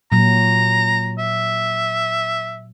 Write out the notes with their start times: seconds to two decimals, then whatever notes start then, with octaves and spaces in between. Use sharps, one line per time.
0.12 A#2 F#3 A#5
1.18 E5